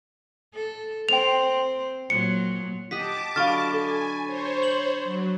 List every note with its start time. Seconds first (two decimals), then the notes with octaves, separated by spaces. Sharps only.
0.54 A4
1.09 C4 G5 F7
2.10 A#2 F#3 C#7
2.91 G4 D#5 F#5 A5 D6 B6
3.36 D3 F#3 D#5 F5 B5 C#6 F6 A6
3.73 A4 G#5
4.26 C5 C#5
4.63 F#7
5.04 F#3